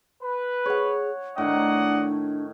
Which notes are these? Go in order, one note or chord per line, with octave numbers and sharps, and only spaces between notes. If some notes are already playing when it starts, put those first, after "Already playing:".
B4
G#4 C#5 F#5
A2 D#3 D4 D5 D#5 F#5